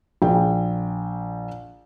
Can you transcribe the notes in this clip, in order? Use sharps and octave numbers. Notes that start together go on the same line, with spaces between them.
A#1 G#4 G5